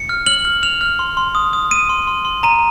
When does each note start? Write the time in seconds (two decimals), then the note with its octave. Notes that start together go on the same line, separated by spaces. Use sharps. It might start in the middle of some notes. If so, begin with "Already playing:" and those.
Already playing: C#7
0.09 F6
0.26 F6 F#7
0.45 F6
0.63 F6 F7
0.81 F6
0.99 C6
1.17 C6
1.35 D#6
1.53 D#6
1.71 D#6 D#7
1.89 C6
2.07 C6
2.25 C6
2.43 A#5 D#7